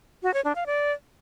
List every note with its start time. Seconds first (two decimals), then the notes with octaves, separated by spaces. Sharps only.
0.23 F#4
0.34 C#5
0.45 D4
0.55 F5
0.66 D5